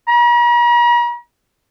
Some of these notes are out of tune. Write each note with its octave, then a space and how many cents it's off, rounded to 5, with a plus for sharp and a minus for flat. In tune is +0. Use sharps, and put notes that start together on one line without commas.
A#5 +45